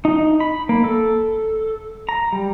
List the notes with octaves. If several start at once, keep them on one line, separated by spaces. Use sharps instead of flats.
D#4
B5
A#3
A4
A#5
G3